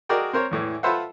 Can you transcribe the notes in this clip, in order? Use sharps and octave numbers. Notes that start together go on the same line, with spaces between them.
F#4 G#4 A#4 D5 D#5 G5
C4 A#4 C5 C#5
E2 A2 E3
F4 A4 B4 C5 E5 F#5